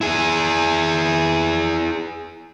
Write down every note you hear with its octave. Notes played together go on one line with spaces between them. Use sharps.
E4 G#4